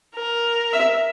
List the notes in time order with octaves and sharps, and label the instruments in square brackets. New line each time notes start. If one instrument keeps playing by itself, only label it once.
[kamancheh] A#4
[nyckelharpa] E5